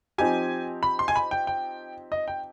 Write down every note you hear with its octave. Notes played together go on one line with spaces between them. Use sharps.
F3 C4 D#4 G4 G#5
B5
C6
G#5
B5
G5
G5
D#5
G5